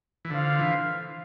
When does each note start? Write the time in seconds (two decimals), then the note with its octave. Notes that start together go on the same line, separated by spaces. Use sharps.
0.25 E3
0.30 D3 F4 C5 F5
0.59 E3